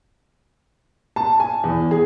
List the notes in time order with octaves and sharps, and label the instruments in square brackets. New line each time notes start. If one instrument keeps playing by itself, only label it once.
[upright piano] A5
G#5
E2
G#4